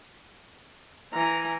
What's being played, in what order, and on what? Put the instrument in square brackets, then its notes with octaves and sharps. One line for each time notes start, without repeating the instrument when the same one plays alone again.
[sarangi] E3 [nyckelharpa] A#5